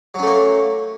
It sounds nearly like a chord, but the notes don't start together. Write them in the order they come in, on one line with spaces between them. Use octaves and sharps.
F#3 C#4 A3 A#3